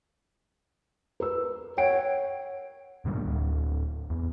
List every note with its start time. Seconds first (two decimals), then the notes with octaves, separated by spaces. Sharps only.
1.20 A#4 B4 E6
1.78 C#5 F#5 G5 D7
3.05 A#2 D3 D#3 G3
3.26 D1
4.10 E2